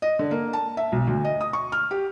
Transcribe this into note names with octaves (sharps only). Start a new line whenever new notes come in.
D#5
D3
A#3
A5
E5
B1
D2
D#5
D#6
C#6
F6
G4